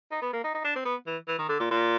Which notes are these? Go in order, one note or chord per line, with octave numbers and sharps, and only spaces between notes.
D#4
B3
A#3
D#4
D#4
D4
C4
B3
E3
E3
D#3
D3
A#2
A#2